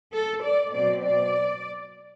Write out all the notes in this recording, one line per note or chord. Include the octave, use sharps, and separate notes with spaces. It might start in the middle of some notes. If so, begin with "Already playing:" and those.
A4
D5
B2 F#3 C4 D5
D5